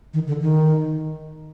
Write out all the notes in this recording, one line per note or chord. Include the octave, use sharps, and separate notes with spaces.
D#3
D3
D#3